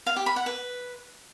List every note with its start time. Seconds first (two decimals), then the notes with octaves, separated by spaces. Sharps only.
0.06 F5
0.16 G4
0.26 B5
0.36 F#5
0.46 B4